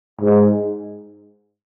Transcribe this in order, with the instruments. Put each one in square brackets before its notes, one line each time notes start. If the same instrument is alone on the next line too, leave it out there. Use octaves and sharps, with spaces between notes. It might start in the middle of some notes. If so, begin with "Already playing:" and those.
[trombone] G#2